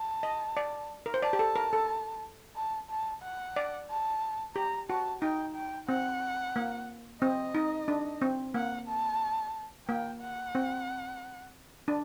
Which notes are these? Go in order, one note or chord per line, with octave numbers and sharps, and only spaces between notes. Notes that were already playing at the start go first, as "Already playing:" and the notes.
Already playing: A5
D#5
D5
A#4
C5
D5 A5
G4
A4
A#4
A4
A5
A5
F#5
D5
A5
G4 A#5
F#4 A5
D#4 G5
G5
C4 F#5
A#3
C4 D#5
D#4
D4
C4
A#3 F#5
A5
A#3 G5
F#5
C4
D4